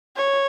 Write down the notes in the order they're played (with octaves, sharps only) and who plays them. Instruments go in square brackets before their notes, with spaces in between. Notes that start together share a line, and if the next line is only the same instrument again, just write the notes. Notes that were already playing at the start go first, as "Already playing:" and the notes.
[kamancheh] C#5